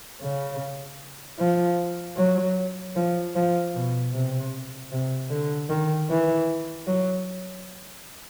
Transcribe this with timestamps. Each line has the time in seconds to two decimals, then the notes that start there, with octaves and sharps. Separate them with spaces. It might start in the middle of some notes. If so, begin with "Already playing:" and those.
0.21 C#3
1.39 F3
2.17 F#3
2.96 F3
3.36 F3
3.75 B2
4.14 C3
4.92 C3
5.30 D3
5.70 D#3
6.10 E3
6.87 F#3